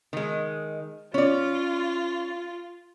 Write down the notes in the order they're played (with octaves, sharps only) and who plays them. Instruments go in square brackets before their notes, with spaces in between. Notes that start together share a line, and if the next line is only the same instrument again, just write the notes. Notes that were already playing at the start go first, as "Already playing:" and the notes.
[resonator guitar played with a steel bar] D#3 G#3
[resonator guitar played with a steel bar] C#4 D5 [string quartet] F4